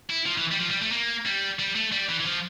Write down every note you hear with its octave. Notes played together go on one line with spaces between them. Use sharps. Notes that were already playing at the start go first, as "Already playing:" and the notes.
E4
F3
E3
G3
F3
G3
A3
A#3
G3
G3
A3
G3
E3
E3
F3